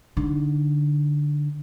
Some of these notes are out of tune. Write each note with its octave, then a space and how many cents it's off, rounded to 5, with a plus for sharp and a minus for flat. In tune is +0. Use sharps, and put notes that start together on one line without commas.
D3 +0 D#4 +0